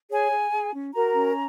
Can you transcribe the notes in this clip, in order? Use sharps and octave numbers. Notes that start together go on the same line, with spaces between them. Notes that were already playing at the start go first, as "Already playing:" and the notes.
G#4 C#5 G#5
G#4
G#4
C#4
F#4 A#4 A#5
C#4